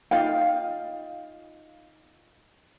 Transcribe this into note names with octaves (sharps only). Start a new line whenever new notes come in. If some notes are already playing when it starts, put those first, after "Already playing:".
D#4 F4 F5 G5